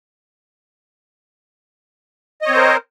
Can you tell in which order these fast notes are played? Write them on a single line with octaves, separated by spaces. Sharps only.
D#5 C#5 C4 C5 A#4